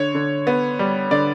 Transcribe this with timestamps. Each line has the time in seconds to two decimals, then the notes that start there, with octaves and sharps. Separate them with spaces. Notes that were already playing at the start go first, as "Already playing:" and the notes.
Already playing: D3 C#5
0.15 D3
0.47 B3
0.79 G3
1.11 D3 D5